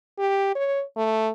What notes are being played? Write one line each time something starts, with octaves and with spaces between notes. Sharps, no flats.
G4
C#5
A3